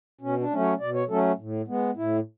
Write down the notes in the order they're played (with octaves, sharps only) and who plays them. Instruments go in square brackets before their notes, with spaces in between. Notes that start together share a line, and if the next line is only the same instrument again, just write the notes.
[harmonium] B2 C#4
D4
F#3 A3 C#4
C#5
B2 D5
C#5
F#3 A3 C#4 A4
A2
G#3 B3
A2 E4